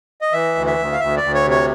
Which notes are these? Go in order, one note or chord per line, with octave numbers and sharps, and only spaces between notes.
D#5
E3 E5
D2
E5
D2
F5
D2 E5
D5
D2
C#5
C3
C#5